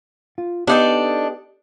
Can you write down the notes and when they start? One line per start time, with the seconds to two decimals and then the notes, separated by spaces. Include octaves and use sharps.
0.38 F4
0.67 B3 D4 D#4 G4 A4 B4